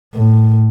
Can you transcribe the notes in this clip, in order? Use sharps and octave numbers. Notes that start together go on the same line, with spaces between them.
A2